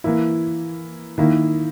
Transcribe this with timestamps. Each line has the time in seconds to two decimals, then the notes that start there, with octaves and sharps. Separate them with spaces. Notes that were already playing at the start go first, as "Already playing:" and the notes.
0.04 E3 A#3 E4
1.18 D#3 A#3 E4